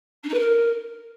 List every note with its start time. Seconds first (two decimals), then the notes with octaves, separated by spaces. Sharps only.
0.23 D4
0.28 D#4
0.33 B4
0.38 A#4